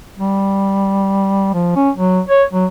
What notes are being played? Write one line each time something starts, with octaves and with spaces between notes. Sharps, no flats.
G3
F3
C#4
F#3
C#5
F#3